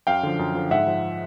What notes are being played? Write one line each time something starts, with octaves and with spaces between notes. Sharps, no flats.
F#2 F5 G5
D3 F3
F#2
D3 F3
G#2 E5 F#5
F3